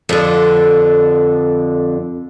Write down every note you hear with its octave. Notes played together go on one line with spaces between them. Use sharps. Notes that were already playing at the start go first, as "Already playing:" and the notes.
F2 D3